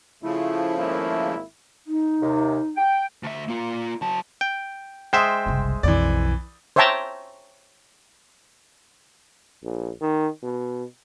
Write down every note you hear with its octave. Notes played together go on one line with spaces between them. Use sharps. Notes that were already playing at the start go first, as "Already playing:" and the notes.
C#3 F3 A3 E4
G#1 A#3 E4
D#4
D#2 C3
G5
D2 E5
A#3 F4
F#3 A5
G5
G#3 C5 E5 G5 D#6
F#1 C2
B1 F2 E3 D5
C5 C#5 E5 G5 A5 A#5
A#1
D#3
B2